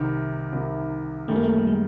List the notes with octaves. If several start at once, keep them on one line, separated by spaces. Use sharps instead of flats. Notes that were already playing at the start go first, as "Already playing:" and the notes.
Already playing: C2 C3 D#3 D#4
C2 C3 D#3
F#2 D#3 G3 A3
A#3
A3
G3
G#3